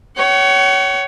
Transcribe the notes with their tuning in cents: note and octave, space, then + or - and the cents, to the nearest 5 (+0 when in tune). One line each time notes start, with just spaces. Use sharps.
C#5 +15 F#5 +45